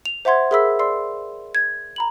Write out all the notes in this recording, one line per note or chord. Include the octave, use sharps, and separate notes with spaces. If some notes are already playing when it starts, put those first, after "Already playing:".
F7
C5 E5 F#5 C6 G#6
G#4 A#4 E5 B5 E6 B6
D5 C6 E6 C7
G#6
A#5 B5 F#7